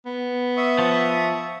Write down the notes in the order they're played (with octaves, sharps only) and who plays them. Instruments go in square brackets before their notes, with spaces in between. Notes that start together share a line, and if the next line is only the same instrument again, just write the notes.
[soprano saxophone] B3
[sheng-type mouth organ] E5 C#6 D#6
[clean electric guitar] F3